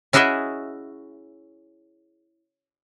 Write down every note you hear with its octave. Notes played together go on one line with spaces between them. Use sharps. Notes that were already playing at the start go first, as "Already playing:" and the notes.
C#4 E4 F#4 G#4 D#5 E5